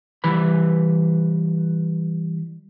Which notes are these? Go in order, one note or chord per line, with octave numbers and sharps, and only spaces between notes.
E3 G3 B4 B5